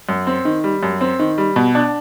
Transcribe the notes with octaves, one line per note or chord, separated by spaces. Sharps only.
F#2
C4
D#3
G3
F#2
C4
D#3
G3
B2
D4